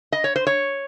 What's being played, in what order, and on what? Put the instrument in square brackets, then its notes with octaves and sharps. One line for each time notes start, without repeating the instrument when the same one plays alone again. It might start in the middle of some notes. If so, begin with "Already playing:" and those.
[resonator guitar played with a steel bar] D#5
C#5
C5
C#5